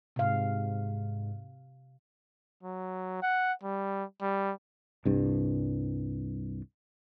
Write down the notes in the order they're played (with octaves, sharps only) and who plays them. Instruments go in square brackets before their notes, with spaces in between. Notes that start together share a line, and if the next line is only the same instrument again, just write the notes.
[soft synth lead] G#2 [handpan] C3 F5
[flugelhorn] F#3
F#5
G3
G3
[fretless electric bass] C2 G2